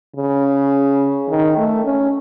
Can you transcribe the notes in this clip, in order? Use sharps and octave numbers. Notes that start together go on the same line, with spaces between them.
C#3
D#3
A3
C#4